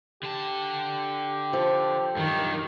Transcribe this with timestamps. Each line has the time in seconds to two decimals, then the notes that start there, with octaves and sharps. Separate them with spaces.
0.23 D3 G4 A5
1.53 F3 A4
2.17 G2 D#3 F#3